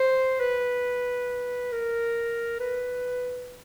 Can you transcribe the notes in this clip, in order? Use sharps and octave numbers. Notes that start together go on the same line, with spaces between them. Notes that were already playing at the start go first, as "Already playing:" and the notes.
Already playing: C5
B4
A#4
B4